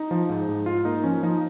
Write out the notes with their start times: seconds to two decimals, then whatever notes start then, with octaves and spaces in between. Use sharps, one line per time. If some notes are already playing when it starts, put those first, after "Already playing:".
Already playing: D#4
0.11 F3
0.29 G#2
0.49 G#2
0.66 G#2 F4
0.85 A#3 D#4
1.03 F3 C#4
1.23 F3 D#4